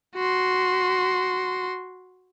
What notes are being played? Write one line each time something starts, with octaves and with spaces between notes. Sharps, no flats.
F#4 C6